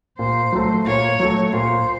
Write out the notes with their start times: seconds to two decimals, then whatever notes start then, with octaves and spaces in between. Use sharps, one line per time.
0.19 A#2 C5
0.52 F#3 A3
0.87 A#2 C#5
1.20 F#3 A3
1.53 A#2 C5